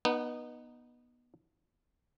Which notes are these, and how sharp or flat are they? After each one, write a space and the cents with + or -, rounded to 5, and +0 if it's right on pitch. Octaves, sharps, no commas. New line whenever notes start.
B3 -20 D#4 -15 F#5 +25